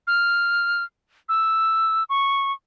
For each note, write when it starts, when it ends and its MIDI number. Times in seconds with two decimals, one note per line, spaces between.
0.07 0.83 89
1.29 2.04 88
2.10 2.52 85